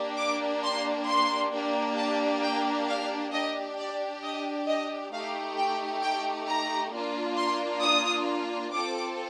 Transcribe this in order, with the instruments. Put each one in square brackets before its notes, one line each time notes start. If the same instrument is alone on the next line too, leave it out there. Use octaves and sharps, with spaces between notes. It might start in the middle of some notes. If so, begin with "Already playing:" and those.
Already playing: [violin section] A#3 D4 G4
D6
C6
C6
A#3 D4 G4
A5
G5
F5
D4 G4 D#5
D5
D#5
D#5
A3 D#4 G4 F5
G5
G5
A#5
A#3 D4 F4
C6
D#6
C4 F4 A4 D6